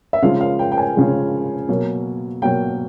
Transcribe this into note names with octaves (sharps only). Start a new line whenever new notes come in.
E5
C#3 F3 G#3 F5
F5
G5
G5
G#5
C#3 F3 G#3
B2 F#3 A#3
B2 F#3 A#3 G5